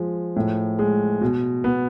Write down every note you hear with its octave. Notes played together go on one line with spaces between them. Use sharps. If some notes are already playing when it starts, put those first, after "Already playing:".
Already playing: F3 G#3
A2
G#3
B2
B3